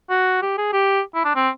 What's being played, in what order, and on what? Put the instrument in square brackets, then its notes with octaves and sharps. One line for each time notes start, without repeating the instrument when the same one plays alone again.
[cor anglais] F#4
G4
G#4
G4
E4
D4
C4